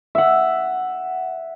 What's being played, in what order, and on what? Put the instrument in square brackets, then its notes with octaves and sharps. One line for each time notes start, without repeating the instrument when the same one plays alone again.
[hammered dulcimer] E5 F#5